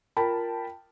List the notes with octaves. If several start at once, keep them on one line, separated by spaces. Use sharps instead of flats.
F4 A#4 G5 A5 B5